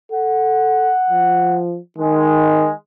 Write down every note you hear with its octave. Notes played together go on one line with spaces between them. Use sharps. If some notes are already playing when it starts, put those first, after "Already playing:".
A4 F#5
F3
D#3 G#3